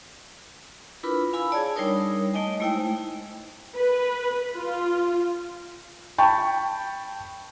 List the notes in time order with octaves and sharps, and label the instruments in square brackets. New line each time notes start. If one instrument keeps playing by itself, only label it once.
[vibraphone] D4 E4 F4 A#4 B4 B5
F5 G#5 B5 E6
G#4 C#5 D5 A5
G3 D4 D#4 A#4 C#5 D#6
A3 D#4 D#5 G#5
G#3 A3 E4 C5 G5
[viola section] B4
F4
[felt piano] G5 A5 B5 C#6